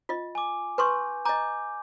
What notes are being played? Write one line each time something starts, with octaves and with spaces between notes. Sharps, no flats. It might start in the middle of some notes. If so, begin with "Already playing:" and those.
F4 D#5
G#5 D6
B4 G#5 C6 C#6 G6
D#5 G#5 A#5 D6 G6